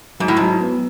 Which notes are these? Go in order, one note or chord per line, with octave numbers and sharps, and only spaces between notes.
G#2 F#3
A2
G#2 F#3
B3